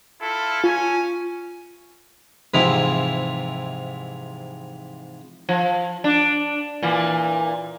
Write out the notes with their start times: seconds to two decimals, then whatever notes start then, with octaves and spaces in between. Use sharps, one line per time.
0.21 E4 F4 A4
0.64 C#4 F4 G#5
2.54 G#2 C3 E3 F3 E4
5.49 F3
6.04 D4
6.82 A#2 E3